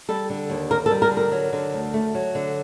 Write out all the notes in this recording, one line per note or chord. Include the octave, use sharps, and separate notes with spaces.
G3 A4
D3
D#2
A#3 A#4
A4
G3
A#4
D3
A#4
F#3
D3
D2
A3
F#3
D3